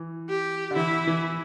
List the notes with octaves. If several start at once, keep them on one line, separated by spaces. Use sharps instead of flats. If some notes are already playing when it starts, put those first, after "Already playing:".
Already playing: E3
G4
D3
E3 E4
E3